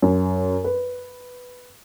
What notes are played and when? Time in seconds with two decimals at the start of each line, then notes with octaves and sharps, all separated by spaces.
0.02 F#2
0.64 B4